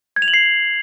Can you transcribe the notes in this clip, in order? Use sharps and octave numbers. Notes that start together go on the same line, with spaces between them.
G#6
F7
F#7
C7